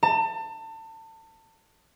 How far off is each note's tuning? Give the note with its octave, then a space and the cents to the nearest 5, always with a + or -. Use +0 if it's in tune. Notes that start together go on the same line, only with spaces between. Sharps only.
A5 +30